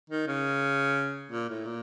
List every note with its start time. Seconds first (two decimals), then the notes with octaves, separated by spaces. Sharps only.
0.10 D#3
0.27 C#3
1.31 A#2
1.49 A2
1.66 A#2